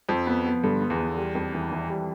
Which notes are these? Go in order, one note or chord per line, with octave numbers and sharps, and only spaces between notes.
F2 F3
B3
B3
G2 D3
B3
E2
B3
G3
F2
E3
E3
G3